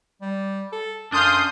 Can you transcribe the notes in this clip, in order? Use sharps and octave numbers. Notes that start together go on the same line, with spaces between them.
G3
A4
F#2 D4 F5 C6 D#6 G6